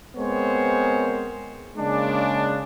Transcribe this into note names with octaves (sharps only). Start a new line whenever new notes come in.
G#3 B3 C4 A#4 C5 C#5
C#3 G#3 A#3 D4